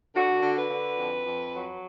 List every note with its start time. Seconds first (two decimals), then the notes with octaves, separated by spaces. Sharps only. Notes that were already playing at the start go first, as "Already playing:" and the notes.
0.15 D3 F#4
0.43 D3
0.57 B4
0.71 D3
0.99 F2
1.26 F2
1.53 F#3